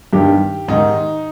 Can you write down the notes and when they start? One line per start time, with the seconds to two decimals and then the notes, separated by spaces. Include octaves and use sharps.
0.13 G2 D#3 G4
0.68 G#2 D#3 D#4